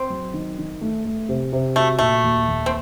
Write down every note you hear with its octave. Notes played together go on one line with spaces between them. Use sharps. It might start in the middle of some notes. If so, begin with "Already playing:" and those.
Already playing: C4
F#3
D#3
D#3
A3
A3
C3
C3
A3 F#4
A#2 A3
D#2
D#2
C4